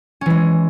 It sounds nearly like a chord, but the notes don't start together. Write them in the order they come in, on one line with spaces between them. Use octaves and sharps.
C#4 E3 G#3